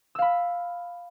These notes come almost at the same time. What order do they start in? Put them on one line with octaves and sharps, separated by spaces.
E6 F5 B5